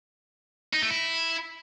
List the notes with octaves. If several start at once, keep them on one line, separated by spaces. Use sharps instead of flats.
D#4
A3
E4